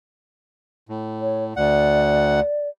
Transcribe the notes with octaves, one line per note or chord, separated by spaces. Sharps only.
A2
C#5
D2 D5 F#5